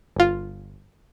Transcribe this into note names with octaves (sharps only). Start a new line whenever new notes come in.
G1 F4